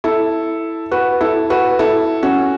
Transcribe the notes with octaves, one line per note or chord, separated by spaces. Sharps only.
E4 A4
F#4 B4
E4 A4
F#4 B4
E4 A4
C#4 F#4